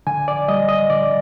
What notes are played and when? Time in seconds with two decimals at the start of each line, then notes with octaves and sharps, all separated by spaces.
0.07 D3 G#5
0.28 D5
0.48 G3 D#5
0.69 D#5
0.90 D3 D5